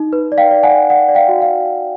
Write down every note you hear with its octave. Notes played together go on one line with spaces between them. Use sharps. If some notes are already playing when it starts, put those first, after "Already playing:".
Already playing: D#4
B4
D5
F5 G5
D5
F#5 G#5
D5
D5 F#5
D5
F5 G5
F#4
F5